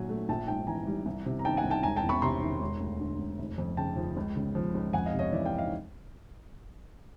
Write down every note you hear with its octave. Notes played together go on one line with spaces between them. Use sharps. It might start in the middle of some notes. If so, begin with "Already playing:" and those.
Already playing: A#2 F#3 G#5
A3
A#1 G5 A5
G#2 G5 A5
E3 G#5 A#5
G3
C2
C3
A#5
D#3 G5 A5
F#5 G#5
C2
G5 A5
E1 G#5 A#5
G5 A5
E2
B5 C#6
C3 A#5 C6
D#3
E1
D2
D3
E1
F1
F2
C#3 G5 A5
F3
C#2
C#3
F3
C#2
F2 F#5 G#5
D#5 F5
C3
C#5 D#5
E3 D5 E5
F5 G5
D#5 F5